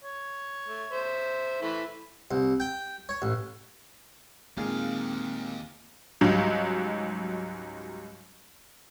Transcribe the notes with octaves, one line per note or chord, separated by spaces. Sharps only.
C#5
A3
C5 E5
E3 A3 E4 B5
C2
G5
C#5
A1
D#2 A#2 D#3 G#3 A#3 C4 G#4 F5
C#2 G#2 F#3 G3